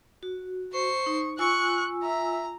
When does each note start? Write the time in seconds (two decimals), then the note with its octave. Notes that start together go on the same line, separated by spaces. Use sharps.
0.23 F#4
0.73 C5 C#6 C7
1.06 D#4
1.39 F4 G#5 C#6 E6 F#6
2.03 E5 A#5